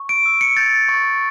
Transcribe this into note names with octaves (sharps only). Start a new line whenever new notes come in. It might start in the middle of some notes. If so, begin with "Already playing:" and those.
Already playing: C#6
D7
E6
C#7
G6 A6
C#6